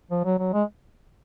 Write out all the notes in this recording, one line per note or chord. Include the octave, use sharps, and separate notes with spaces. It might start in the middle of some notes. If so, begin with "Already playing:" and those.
F3
F#3
F#3
G#3